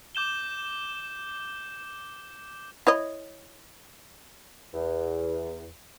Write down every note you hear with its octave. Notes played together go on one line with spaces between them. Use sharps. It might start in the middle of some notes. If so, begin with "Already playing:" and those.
D6 G6 E7 G7
E4 C#5 D#5
E2